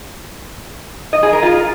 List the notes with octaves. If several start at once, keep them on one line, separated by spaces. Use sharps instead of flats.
D#5
G#4
A#4
F4